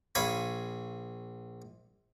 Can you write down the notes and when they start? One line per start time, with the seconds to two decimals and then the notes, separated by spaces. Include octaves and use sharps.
0.15 A#1 C#5 F5 G#5 B5